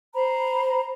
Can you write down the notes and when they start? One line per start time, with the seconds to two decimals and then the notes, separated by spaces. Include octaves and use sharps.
0.14 C5 A#5 B5